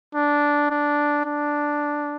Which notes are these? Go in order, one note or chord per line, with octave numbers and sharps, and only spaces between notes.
D4
D4
D4